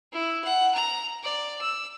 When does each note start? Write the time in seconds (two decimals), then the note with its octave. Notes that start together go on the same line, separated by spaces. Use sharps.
0.12 E4
0.44 F#5
0.74 A#5
1.23 D5
1.61 E6